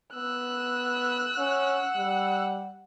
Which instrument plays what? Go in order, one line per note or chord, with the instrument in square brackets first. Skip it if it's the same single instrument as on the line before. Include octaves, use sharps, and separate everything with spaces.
[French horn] B3 [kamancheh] E6 F#6
[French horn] C#4 [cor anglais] F#5
[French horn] G3